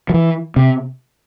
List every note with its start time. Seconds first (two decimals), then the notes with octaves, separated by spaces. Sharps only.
0.10 F3
0.14 E3
0.56 C3